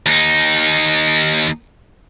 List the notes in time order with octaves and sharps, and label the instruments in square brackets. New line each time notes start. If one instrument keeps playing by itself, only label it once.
[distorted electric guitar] D#2 D#4